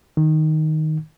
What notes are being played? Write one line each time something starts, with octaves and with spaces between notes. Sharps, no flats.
D#3